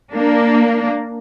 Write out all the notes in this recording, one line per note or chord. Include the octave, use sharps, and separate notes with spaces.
A#3 D4